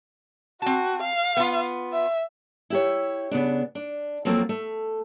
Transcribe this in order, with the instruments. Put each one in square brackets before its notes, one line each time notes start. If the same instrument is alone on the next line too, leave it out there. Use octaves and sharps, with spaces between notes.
[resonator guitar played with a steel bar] C4 A5 [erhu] F#4
[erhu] F5
[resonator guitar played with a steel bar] B3 F4
[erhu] E5
[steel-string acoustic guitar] E4 G4 C#5
C#3 B3 D4
D4
F3 F#3 A3 A#3 C4
A3